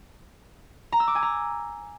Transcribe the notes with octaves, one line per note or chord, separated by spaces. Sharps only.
A#5
E6
D6
G#5
A#5